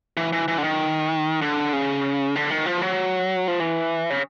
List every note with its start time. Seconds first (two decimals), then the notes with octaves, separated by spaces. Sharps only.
0.17 E3
0.33 E3
0.48 E3
0.58 D3
0.64 D#3
1.42 D3
1.73 C#3
2.36 D3
2.50 D#3
2.66 F3
2.82 F#3
3.48 F3
3.60 E3
4.10 C#3